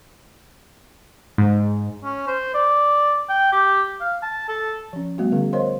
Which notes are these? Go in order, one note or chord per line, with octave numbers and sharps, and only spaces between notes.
G#2
C#4
C5
D5
G5
G4
F5
A5
A4
F3 C#4
G3 A3 B3 F#4
D3 C#4 G#4 F5
A#4 C5 C#5 D#5 F5 C6